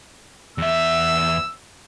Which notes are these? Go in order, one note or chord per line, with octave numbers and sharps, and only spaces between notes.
E2 E5 E6